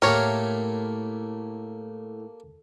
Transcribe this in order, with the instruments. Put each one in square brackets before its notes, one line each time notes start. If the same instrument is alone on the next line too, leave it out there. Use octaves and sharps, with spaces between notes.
[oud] A2 [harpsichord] A#3 G4 A4 [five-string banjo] A#4 C#5